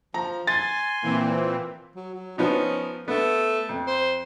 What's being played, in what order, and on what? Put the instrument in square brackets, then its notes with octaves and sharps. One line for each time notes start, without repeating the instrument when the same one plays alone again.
[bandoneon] F3 [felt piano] A#5
[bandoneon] G#5 C6 [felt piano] A6
[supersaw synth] A#2 E3 C4
[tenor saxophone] F#3
F#3
[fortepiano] F3 B3 D#4 [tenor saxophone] C#4
[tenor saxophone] A3 [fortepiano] B3
[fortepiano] F2
[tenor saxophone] C5